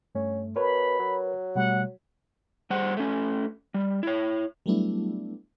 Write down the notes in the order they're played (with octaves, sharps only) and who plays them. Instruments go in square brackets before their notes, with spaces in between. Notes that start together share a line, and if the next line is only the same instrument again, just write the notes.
[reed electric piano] G2 A3 [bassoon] C#4
[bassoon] B2 [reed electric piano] A#4 B4 C#5 [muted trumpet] B5
[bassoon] F#3
[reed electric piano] B2 G3 A3 [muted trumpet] F#5
[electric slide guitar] G3 C5 F#5
A3 C#4
G3
E4 C#5
[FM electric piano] F#3 G3 A3 B3 D4 E4